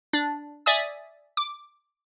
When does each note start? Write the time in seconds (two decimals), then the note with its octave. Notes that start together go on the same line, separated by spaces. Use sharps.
0.13 D4
0.66 D5 E5 G#5 D#6
1.37 D6